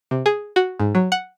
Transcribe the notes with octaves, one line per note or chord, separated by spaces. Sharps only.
C3
G#4
F#4
G#2
F#3
F#5